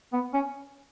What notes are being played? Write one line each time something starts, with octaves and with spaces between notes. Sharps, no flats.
B3
C#4